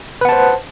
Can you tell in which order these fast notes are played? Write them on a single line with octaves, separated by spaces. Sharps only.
B4 F#5 A5 C5